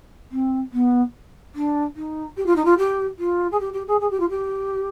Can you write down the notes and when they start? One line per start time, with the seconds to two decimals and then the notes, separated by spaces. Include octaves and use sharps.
0.32 C4
0.73 B3
1.55 D4
1.96 D#4
2.37 G4
2.46 F4
2.56 D#4
2.65 F4
2.78 G4
3.19 F4
3.52 G#4
3.60 G4
3.73 G4
3.88 G#4
4.01 G#4
4.11 G4
4.20 F4
4.30 G4